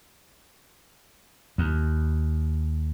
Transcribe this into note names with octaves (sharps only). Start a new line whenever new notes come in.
D#2